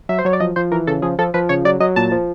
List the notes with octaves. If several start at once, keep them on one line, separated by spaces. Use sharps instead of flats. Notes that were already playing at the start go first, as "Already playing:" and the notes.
F#3 E5
C5
F#3 C#5
D5
F3 D#5
F3 C5
E3 A#4
C#3 A4
F3 G#4
F3 A4
F3 B4
C#3 C#5
F#3 D5
F#3 D#5
A#2 A5
F3